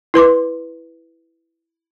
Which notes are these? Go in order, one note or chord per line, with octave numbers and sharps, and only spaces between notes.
E4 B4 C6 D6